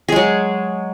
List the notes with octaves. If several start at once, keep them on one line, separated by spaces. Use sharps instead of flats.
F#3 G#3 G#4